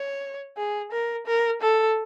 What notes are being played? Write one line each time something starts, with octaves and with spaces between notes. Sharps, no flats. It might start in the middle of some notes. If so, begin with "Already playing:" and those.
Already playing: C#5
G#4
A#4
A#4
A4